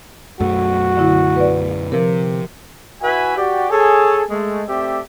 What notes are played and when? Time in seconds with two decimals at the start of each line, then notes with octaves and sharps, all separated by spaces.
0.40 B1 F#2 A3 F#4
0.97 D3 E4
1.36 B4 D5
1.92 C3 F3 A#4
3.02 E4 F#4 B4 E5 G#5
3.37 F#4 G4 D5
3.70 G#4 A4 C#5
4.30 G#3 A3
4.67 A3 C4 G4 D5 E5